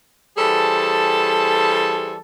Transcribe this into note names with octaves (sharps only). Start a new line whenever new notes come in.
E3 G3 G#4 A4 C5 A5